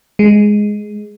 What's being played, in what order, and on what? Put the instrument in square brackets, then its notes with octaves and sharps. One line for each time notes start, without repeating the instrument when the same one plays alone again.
[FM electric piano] G#3